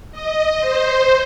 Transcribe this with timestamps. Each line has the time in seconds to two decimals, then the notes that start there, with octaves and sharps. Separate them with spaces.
0.12 D#5
0.60 C5